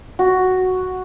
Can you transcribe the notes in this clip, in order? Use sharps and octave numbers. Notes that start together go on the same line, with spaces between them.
F#4